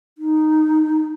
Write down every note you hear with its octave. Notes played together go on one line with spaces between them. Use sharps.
D#4